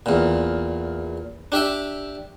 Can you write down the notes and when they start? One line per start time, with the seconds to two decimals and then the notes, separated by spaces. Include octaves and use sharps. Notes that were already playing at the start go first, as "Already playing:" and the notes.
0.06 E2 A#2
1.52 D4 G4 E5 G5